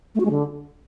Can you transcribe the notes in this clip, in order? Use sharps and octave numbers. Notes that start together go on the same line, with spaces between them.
A3
F#4
G#3
D3